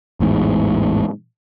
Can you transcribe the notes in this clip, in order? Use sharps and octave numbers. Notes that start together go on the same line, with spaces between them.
A1 E2 G#2